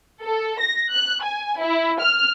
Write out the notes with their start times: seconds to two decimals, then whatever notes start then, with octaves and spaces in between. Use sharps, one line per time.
0.21 A4
0.59 A#6
0.91 F#6
1.23 G#5
1.59 E4
2.00 F6